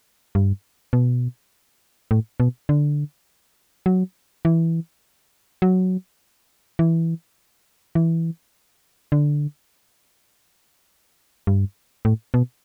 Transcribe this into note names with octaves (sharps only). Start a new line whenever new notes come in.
G2
B2
A2
B2
D3
F#3
E3
F#3
E3
E3
D3
G2
A2
B2